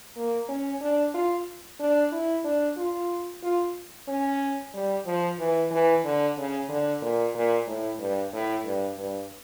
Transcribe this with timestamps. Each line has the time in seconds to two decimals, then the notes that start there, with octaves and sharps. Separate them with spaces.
0.17 A#3
0.49 C#4
0.81 D4
1.14 F4
1.80 D4
2.12 E4
2.44 D4
2.77 F4
3.43 F4
4.08 C#4
4.74 G3
5.06 F3
5.39 E3
5.71 E3
6.04 D3
6.37 C#3
6.69 D3
7.02 A#2
7.35 A#2
7.67 A2
7.99 G2
8.33 A2
8.65 G2
8.98 G2